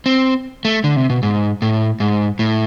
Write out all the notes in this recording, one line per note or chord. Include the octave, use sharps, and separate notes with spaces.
C4
A3
D3
C3
B2
G#2
A2
G#2
A2